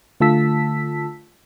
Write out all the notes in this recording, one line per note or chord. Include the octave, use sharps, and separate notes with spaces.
D3 A3 F4 A5 E6 B6